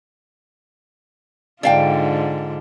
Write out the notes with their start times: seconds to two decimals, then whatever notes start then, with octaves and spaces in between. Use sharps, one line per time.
1.63 G#2 D3 D4 F4 F5 G5